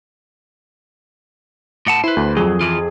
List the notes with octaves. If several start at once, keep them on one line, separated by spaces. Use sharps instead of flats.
A2 F#5 A5
E4 B4 C5
D2
F2 F#3 G#4
E3 F4